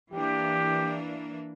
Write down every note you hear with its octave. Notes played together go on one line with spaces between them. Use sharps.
E3 A#3 D4 G4